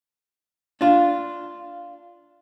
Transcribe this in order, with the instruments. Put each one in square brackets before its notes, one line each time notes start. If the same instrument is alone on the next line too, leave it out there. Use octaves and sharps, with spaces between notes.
[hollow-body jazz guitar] D4 F4